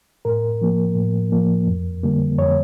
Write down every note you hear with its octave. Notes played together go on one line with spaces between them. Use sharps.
A2 A#4
F3 A#3
A2
F3 A#3
F2
D3 G3 A#3
F2 C#5